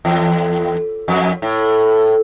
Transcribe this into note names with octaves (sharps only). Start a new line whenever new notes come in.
E2
F2
A2